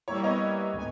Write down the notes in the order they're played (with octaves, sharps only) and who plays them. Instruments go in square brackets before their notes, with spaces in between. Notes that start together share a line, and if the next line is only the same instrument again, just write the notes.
[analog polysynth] G3 A#3 E4 [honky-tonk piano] C#5
[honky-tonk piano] B3 C#5 D#5
[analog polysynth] D2 G#2 G#5